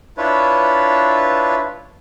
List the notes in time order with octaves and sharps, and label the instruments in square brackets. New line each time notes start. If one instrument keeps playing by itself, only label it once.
[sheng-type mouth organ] D4 E4 F4 B4 C#5